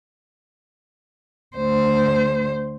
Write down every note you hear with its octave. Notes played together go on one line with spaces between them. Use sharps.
D2 C5